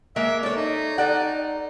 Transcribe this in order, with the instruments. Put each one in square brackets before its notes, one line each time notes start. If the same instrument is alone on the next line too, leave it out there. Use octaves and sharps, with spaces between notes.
[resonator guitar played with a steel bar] G#3 A#3 [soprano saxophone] E5
[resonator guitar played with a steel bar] A4 C#5 [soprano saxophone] D5
[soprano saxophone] D#4
[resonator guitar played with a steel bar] A4 D5 F#5